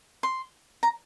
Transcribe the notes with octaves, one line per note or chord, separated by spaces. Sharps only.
C6
A#5